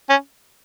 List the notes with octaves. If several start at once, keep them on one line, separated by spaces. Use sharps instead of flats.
C#4